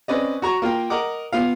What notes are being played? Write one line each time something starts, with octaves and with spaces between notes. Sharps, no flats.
C4 C#4 B4 D5 D#5
F#4 A#5 C#6
A#3 F4 A#4 G5
A#4 D#5 F#5 D6
B3 F4 F5